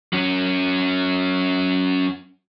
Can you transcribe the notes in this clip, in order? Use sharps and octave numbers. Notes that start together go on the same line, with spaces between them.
F#3 C#4